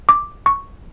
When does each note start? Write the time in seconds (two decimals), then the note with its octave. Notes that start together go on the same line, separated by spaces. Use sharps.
0.09 D6
0.46 C#6